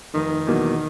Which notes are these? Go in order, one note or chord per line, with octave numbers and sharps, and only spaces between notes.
F1 D#3
E2 B2 F#3 A#3